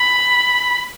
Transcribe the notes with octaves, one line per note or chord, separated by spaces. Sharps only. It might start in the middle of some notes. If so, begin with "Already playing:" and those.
Already playing: B5